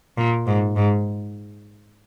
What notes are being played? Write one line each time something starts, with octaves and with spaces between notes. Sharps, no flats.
A#2
G#2
G#2